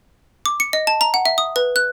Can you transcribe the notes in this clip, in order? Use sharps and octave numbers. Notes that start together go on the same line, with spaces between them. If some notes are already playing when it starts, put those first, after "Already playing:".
D6
C#7
D#5
A5
A#5
F#5
E5
D#6
B4
F#6